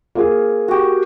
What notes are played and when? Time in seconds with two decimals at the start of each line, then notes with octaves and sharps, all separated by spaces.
0.15 A#3 F4 G#4
0.68 F#4 G4